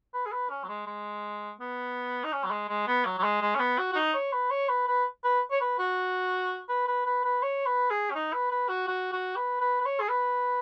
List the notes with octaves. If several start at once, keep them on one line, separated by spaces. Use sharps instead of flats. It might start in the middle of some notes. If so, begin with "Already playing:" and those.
B4
G#4
B4
C#4
F#3
G#3
G#3
B3
D#4
C#4
F#3
G#3
G#3
B3
F#3
F#3
G#3
G#3
C#4
B3
F#4
F#4
D#4
C#5
B4
C#5
B4
B4
B4
C#5
B4
F#4
B4
B4
B4
B4
C#5
B4
G#4
C#4
D#4
B4
B4
F#4
F#4
F#4
B4
B4
B4
C#5
G#4
B4